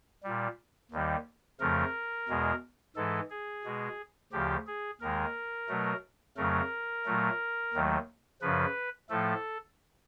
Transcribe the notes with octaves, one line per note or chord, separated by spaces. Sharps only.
A#2 G3
D#2 D#3 G3
F2 C#3 F3 A3 A#4
E2 B2 G#3
G#2 E3 G#3 A4
G#4
B2 G#3
D2 C#3 F3 G4
G#4
D#2 D#3 G#3 A#4
B2 F#3 A3
F2 C#3 F#3 A3 A#4
A#2 F#3 A3
D#2 D#3 F#3 A3
F#2 C#3 F3 B4
A2 F3 A3 A4